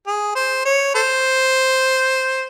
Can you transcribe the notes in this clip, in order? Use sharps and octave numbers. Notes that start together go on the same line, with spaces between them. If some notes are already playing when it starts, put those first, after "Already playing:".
G#4
C5
C#5
A4 C5